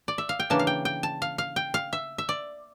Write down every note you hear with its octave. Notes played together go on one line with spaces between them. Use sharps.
D5
E5
F5
G5
C#3 E3 A#3 D4 A5
F5
G5
G5
A5
F5
F5
G5
F5
E5
E5
D5